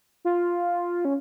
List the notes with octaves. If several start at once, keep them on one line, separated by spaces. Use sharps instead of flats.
F4
C#4